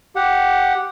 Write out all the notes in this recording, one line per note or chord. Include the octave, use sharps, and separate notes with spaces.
G4 F#5